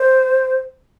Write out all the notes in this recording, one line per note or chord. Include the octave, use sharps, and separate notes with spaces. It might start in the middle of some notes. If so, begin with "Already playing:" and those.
Already playing: C5